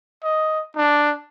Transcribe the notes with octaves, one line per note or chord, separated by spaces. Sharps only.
D#5
D4